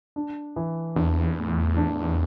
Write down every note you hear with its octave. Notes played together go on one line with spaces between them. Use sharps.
D4
E3
E2 D4
A2
D4